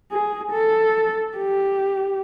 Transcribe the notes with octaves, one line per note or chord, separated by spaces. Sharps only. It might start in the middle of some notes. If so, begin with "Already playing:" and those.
G#4
A4
G4